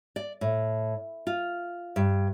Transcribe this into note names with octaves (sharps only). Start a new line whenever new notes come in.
D5
A2
F4
G2